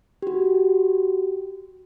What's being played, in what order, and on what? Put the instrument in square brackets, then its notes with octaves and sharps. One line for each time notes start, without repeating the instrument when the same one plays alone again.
[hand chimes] F#4 G4